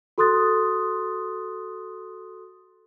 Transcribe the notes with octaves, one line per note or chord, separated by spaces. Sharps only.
F#4 A4 C6 D#6 F#6 A6